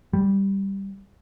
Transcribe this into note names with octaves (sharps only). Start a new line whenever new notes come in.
G3